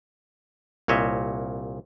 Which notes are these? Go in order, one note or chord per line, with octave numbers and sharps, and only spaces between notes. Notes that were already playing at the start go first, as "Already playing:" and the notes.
C2 A#2 C#5 D#5 E5